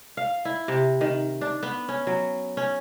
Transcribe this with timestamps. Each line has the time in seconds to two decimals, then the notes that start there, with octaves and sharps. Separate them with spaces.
0.17 F5
0.45 E4
0.68 C3
1.01 D#3
1.41 D4
1.63 B3
1.89 C#4
2.07 F#3
2.57 C#4